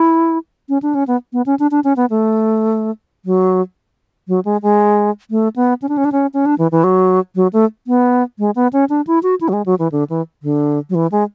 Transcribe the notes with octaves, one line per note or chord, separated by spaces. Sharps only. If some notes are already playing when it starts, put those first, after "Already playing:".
Already playing: E4
C#4
D4
C#4
B3
B3
C#4
D4
D4
C#4
B3
A3
F#3
F#3
G#3
G#3
A3
B3
C#4
D4
C#4
D4
C#4
C#4
D4
E3
E3
F#3
F#3
A3
B3
G#3
B3
C#4
D4
E4
F#4
E4
F#3
G#3
F#3
E3
D3
E3
D3
F#3
E3
G#3